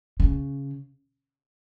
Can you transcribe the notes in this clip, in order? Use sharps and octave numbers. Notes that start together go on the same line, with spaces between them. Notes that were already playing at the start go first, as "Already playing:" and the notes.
C#3